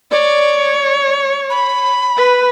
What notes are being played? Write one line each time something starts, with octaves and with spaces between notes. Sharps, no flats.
C#5 D5
B5
B4